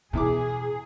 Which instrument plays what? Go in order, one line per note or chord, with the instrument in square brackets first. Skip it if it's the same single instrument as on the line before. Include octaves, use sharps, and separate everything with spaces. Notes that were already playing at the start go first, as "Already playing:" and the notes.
[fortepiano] E2 E4 D6 [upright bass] B2 [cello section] G#4